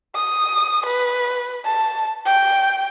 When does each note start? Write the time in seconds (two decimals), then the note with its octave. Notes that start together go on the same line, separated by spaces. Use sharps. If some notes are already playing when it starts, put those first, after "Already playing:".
0.15 D#6
0.86 B4
1.65 A5
2.25 G5